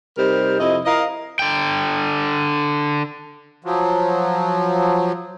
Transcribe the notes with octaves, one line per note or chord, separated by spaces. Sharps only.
C3 G3 D#4 A#4 C5
F2 C3 E4 D#5
E4 A#4 D#5 F5
D3 G5
F3 F#3